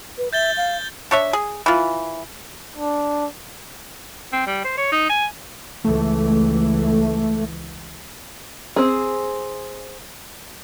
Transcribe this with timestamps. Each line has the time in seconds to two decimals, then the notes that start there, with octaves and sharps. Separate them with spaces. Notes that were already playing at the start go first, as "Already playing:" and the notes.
0.18 B4
0.33 E5 G6 A6 G7
0.57 F5
1.11 D4 C#5 E5
1.33 G#4
1.66 E3 F4
2.77 D4
4.33 C4
4.47 G3
4.64 C5
4.77 C#5
4.92 D#4
5.09 G#5
5.85 C#2 E3 A3
8.76 C4 G#4